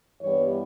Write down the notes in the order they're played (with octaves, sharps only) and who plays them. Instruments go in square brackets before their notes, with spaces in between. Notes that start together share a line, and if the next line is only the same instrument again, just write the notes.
[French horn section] G2 E3 G3 B3 C#5